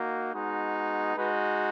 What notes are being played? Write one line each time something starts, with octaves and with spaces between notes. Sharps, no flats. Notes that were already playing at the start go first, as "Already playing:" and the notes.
Already playing: A#3 D#4 F#4
G#3 B3 D#4 F#4
G#3 D#4 F#4 B4